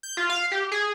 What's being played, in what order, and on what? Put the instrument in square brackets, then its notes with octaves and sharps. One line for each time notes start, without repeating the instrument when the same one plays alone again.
[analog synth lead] G6
F4
F5
G4
G#4